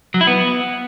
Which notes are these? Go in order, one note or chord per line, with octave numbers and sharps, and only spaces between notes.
F#3
E4
B3